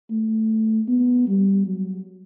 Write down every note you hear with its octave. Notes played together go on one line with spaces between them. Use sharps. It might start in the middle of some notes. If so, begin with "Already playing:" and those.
A3
B3
G3
F#3